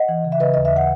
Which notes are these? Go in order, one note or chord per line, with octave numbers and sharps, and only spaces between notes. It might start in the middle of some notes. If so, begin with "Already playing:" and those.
Already playing: D#5 F#5
E3
C#3
E5
C#3 B4 D#5
D#2 D#5
E5
F#5